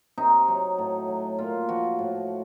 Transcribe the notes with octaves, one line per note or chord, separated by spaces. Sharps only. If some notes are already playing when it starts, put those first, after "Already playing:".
C3 D#4
F#3
A2
F#3
A#2 F4
F3 F#4
A2